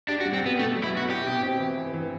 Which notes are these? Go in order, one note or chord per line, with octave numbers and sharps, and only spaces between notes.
D4 G4
F#4
G3
C4
B3 G4
B2 A3
F#3
E4
B3 F#4
E4 G4
B2
C4
E3
E3
E3